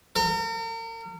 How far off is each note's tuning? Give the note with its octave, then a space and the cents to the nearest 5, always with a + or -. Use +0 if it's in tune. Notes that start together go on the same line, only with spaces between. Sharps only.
A#4 -40